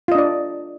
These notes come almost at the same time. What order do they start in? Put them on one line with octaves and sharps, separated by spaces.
F4 D#5 D4 D5